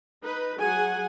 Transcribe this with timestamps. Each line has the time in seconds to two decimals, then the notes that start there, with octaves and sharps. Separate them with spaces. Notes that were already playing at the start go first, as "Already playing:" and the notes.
0.22 D#4 B4
0.60 F#3 G#4 F#5 G#5